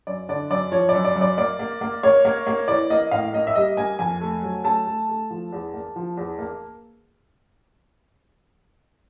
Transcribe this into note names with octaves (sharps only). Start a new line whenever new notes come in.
F#2 D5
D3 D5
F#2 D5
F3 C#5
F#2 D5
D5
F#2
D5
A#3 D5
A#3
A#3
A#3 C#5
A#3
A#3
E3 D5
A#3 D#5
A2 F5
A#3 D#5
E5
G3 D#5
A#3 G#5
F2 G#5
A3
F#3
A3 A5
A3
A3
F3
E2
A#3
F3
E2
A#3